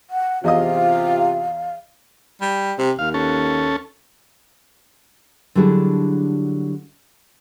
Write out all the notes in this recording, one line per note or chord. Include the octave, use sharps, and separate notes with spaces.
F#5
E2 C3 F4 D#5 F5 D#6
G3
C3
D#2 F5
C#4 A4
D3 F#3 G3 D4 E4 G#4